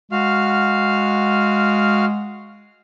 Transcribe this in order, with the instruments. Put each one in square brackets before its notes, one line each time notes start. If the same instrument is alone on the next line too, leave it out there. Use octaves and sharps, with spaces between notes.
[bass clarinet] G#3 [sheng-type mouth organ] F#4 F5 F6